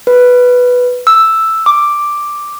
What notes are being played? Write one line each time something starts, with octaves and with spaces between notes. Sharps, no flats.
B4
E6
D6